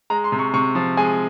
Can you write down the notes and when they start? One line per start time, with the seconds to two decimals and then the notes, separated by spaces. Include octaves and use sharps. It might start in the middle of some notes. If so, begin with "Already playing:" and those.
0.10 G#3 A#5
0.24 C6
0.32 C3
0.39 C#6
0.54 C3 C#6
0.75 F3
0.97 G#3 G#5